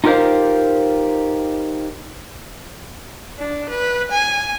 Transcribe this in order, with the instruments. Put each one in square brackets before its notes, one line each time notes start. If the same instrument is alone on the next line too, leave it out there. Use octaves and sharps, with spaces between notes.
[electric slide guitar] D#4 F4 G4 A#4 C5 F5
[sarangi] D4
B4
G#5